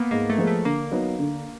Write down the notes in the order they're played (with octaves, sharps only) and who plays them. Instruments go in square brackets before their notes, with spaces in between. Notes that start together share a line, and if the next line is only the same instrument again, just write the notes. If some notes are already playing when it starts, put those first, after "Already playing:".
Already playing: [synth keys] A#3 B3
[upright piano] G#2 [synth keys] A#3
[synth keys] A3
[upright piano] F3 G#3 B3
[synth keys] A3
[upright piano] D3 [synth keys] A#3
[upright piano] F#3 B3 D#4
D3